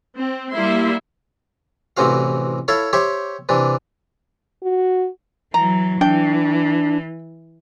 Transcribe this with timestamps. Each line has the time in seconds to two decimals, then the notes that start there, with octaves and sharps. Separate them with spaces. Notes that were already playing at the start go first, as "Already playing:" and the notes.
0.16 C4
0.53 G3 A#3 E4 E5 C6
1.97 A1 C3 E3 C4 F#4 F5
2.68 E4 A4 C#5 F5 B5
2.93 G4 C5 C#5 E5
3.49 C3 E3 D4
4.63 F#4
5.54 E3 F#3 A#5
6.01 E3 D4 G5